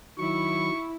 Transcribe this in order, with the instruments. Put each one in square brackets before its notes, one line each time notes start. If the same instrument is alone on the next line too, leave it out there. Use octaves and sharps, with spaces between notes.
[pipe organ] D#3 F#3 [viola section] E4 [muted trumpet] C#6